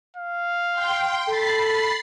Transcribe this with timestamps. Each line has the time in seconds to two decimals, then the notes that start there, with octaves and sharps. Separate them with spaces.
0.17 F5
0.72 G5 C6
1.28 A4 B5 A6 C7